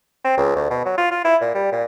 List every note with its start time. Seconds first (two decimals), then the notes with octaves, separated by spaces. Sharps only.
0.25 C4
0.37 C#2
0.56 D2
0.70 B2
0.85 F#3
0.98 F4
1.11 F4
1.25 E4
1.41 A#2
1.55 G3
1.72 A#2